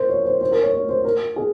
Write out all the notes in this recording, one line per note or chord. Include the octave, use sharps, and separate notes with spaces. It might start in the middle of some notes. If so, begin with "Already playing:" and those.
Already playing: A#4 C5
C#5
C5
C5
A#4
C#5
C#5
C5
A#4
G#4